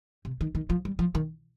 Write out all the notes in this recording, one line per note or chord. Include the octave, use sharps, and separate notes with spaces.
C3
D#3
D#3
F3
G3
F3
D#3